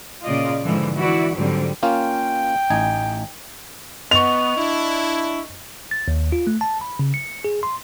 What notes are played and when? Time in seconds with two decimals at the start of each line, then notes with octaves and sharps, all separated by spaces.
0.24 A#2 C#3 F4 D5 D#5
0.63 G#2 B2 D3 E3 F3
0.97 E3 E4 F#4 D5
1.35 G#2 D3 F#3 G3 C4
1.83 A#3 C#4 F4 G5
2.70 A1 D#4 G#5
4.11 B3 D#5 C#6 F7
4.57 D4 E4
5.91 A6
6.08 D#2
6.32 F4
6.47 A3
6.61 A5
6.81 B5
6.99 C#3
7.14 C#7
7.45 G#4
7.63 C6